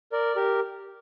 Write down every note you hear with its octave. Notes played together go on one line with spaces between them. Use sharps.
A#4 D5
G4 A#4